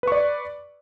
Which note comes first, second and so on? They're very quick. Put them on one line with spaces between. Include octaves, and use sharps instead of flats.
B4 C#6 D5